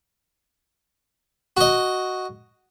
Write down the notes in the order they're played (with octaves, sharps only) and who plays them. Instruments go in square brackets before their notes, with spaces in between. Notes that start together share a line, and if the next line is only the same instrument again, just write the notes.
[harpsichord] F#4 D#5